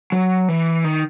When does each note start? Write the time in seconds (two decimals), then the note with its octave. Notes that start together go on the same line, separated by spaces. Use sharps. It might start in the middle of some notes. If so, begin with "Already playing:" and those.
0.12 F#3
0.48 E3
0.84 D#3